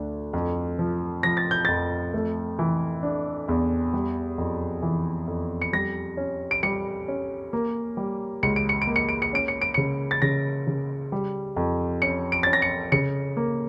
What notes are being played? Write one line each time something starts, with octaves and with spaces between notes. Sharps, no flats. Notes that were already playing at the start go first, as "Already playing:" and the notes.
Already playing: D2 D4
F2
F3
F3 A#6
A6
G6
F2 A6
A3
E3
D4
E2
G3
F2
E3
F2
C#7
G3 A#6
C#4
D7
G3 C#7
C#4
A#3
G3
C#2 C#7
D7
C#7
D7
A#3
C#7
D7
C#7
C#4 D7
C#7
D7
C#3 C#7
A6
C#3 A#6
C#3
G3
F2
C#4 C#7
D7
C#4 A6
A#6
C#7
C#3 C#7
A#3